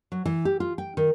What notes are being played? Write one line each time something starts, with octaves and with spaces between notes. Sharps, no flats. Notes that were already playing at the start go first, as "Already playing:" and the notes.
F#3
E3
G4
F4
G5
D#3